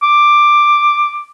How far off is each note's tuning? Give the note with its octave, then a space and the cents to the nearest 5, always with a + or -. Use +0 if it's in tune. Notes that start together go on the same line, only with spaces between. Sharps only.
D6 +10